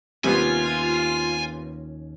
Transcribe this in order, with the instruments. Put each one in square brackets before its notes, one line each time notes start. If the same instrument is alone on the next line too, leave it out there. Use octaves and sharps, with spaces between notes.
[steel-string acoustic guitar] D#2 C#4 [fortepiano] C3 G3 B3 [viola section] F4 [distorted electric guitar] G#5